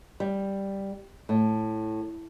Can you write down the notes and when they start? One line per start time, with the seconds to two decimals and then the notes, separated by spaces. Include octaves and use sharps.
0.20 G3
1.29 A2